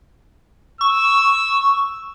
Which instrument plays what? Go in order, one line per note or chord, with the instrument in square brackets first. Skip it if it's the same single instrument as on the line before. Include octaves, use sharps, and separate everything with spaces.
[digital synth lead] C#6 [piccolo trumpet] E6